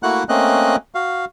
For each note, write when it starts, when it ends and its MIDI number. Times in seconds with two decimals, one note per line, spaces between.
0.03 0.24 57
0.03 0.24 58
0.03 0.24 64
0.03 0.24 66
0.03 0.24 78
0.03 0.24 90
0.29 0.76 57
0.29 0.76 58
0.29 0.76 60
0.29 0.76 61
0.29 0.76 75
0.29 0.76 90
0.95 1.25 66
0.95 1.25 77